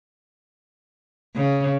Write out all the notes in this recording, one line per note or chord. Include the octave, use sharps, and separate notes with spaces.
C#3